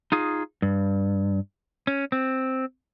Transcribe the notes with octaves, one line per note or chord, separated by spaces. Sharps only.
D#4 F4 G#4
G2
C#4
C4